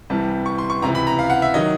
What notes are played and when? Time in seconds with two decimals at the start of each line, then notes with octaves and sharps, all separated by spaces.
0.10 C2 C3 E3 G3 A5
0.46 C#6
0.58 C6
0.70 C#6
0.82 C#2 C3 E3 A#5
0.95 B5
1.07 A#5
1.19 F5
1.30 F#5
1.42 E5
1.54 D#3 F#3 D#5